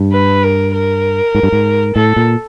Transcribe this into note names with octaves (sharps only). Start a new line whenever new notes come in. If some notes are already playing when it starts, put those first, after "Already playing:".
Already playing: G2
B4
A#4
A#4
G#2
G2
G#2
A2 A4
A#2